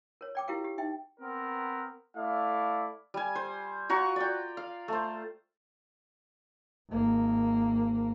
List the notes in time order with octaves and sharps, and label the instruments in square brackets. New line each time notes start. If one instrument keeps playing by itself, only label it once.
[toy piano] A#4 C#5
D5 G5 D6
E4 G4 A#4 F5 G5
G4
D#4 E5 G5
[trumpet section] B3 C4 A#4
A3 E4 D5 F5
[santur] G3 G#5
C5
F4 F#4 A#5 C#6
D5 G5
F5
A3 C5
[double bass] G#1 A#3